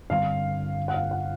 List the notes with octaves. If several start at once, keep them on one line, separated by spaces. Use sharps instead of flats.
G2 D3 G3 C4 F5
F#5
F5
F#5